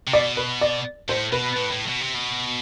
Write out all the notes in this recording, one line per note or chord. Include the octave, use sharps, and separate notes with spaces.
C3
B2 D5
B4
D5
A2 C5
B2 B4
A2
A2
B2
C3
B2